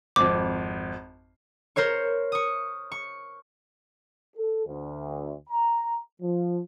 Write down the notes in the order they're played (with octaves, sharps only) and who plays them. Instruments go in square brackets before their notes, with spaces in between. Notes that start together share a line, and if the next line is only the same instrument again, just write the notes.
[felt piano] G#1 F2 [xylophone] D6
[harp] A#4 C5 C#5 C#6
C#6 D#6
C#6
[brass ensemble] A4
D2
A#5
F3